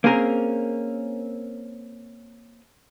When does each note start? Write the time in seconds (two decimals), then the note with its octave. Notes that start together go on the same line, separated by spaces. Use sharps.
0.04 A#3 C4 C#4 G#4 A#4